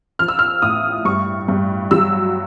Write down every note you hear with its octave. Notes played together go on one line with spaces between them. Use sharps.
F3 F6
E6
F6
A2 D#6
G2 C#6
G2
F#3 E6